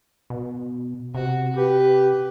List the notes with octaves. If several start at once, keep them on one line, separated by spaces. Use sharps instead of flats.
B2
C3 F#4
G4 B4